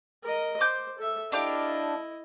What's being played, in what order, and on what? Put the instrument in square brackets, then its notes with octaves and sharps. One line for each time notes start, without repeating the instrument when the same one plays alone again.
[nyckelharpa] A#4 D#5
[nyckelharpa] C5 [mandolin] D6 G6
[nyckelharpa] A4 E5
[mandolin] D4 G4 F5 [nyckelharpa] E4 D#5